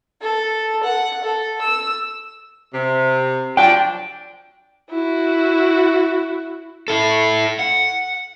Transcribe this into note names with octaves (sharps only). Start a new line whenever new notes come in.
A4
F#5
A4
E6
C3
F3 F#3 D4 G5
E4 F#4
E4 A4
F#5